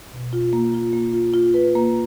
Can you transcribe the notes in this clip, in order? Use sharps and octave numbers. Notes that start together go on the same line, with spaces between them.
B2
F4
A#3
F4
A#3
F4
F4
B4
A#3